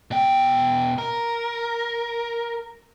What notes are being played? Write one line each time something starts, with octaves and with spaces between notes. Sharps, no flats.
B2 G5
A#4